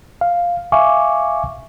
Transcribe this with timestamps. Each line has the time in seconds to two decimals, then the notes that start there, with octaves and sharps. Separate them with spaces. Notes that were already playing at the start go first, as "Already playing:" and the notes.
0.21 F5
0.72 E5 F5 G#5 C#6 D6